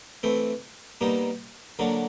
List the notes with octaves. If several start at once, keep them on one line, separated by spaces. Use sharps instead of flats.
E3 A3 C4
B2 G3 A#3 D#4
D3 F#3 A#3 D4